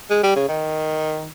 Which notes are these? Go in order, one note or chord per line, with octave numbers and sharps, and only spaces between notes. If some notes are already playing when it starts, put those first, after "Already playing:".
G#3
G3
C#3
D#3